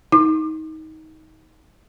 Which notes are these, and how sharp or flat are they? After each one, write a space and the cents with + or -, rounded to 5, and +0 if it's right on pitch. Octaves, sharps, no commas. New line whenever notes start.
D#4 +20 D6 +35